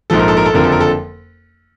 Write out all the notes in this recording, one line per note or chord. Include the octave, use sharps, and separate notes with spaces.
A#1 G#2 F3 A4
A#4
A4
A#4
A4
F#1 F2 D3 F3 A#4
A4
A#4
A4